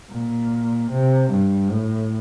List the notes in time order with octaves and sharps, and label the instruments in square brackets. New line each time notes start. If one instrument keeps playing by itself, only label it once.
[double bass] A#2
C3
G2
A2